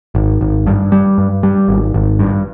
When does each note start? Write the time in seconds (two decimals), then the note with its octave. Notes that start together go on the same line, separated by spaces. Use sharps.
0.15 G#1
0.41 G#1
0.67 G2
0.92 G3
1.18 G2
1.43 G3
1.69 G#1
1.94 G#1
2.19 G2